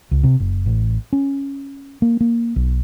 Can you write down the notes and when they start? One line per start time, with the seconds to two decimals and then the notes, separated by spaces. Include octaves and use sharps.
0.11 C#2
0.24 C3
0.40 F#1
0.66 A1
1.13 C#4
2.02 A#3
2.21 A#3
2.56 B1